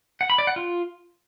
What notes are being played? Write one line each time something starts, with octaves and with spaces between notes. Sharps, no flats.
F#5
B5
D5
F#5
F4